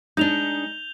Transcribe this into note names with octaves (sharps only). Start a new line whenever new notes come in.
G#3 D4 D#4 G6 F7 G7